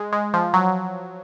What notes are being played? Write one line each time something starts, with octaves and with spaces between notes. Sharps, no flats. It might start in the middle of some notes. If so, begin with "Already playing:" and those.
Already playing: G#3
G#3
F3
F#3